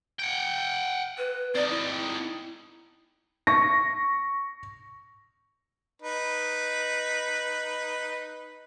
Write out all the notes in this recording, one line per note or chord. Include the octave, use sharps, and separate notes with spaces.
F#5 G5
B4
C4 D#4 D5
E4
C#6 A#6
D#4 B4